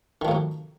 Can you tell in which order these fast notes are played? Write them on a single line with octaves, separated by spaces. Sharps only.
D#3 F3 A2 F#3